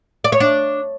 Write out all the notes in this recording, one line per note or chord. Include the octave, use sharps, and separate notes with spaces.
D5
C#5
D4